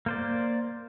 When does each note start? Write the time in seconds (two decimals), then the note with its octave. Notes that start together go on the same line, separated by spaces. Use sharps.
0.06 A#3 C5 D5